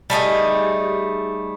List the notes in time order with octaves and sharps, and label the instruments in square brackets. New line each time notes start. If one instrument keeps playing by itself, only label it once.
[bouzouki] G3 A3 D#4 G#4